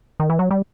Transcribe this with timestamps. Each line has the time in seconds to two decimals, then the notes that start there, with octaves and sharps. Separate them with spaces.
0.20 D#3
0.30 E3
0.39 F#3
0.51 G3